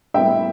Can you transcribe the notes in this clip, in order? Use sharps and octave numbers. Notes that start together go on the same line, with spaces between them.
A2 G3 B3 E5 G5